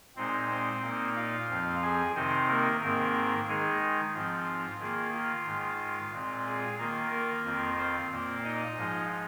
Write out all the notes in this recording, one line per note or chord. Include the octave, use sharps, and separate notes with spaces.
A#2 G#3 C4 D#4 C5
C4 C5
A#2 A#3 D#4
F4 F5
F2 F3 C4
G#4 G#5
C3 D#3 C4 D#4 C5
A#3 A#4
G#2 D#3 A#3 C4 A#4
D#3 G#3 D#4 G#4
G#2 F3 C4 F4
D#3 A#3 F4 G#4
F4
G#2 D#3 G#3
A#2 G#3 C4 F4
G#4
D#3 A#3 F4 A#4
A#3 A#4
F2 D#3 C4 F4
C4 C5
A#2 A#3 F4
D#4 D#5
G#2 F3 G#3 F4